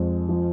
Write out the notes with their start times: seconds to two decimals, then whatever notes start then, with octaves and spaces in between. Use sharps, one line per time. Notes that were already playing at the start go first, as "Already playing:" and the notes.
Already playing: F2 G#3
0.29 F3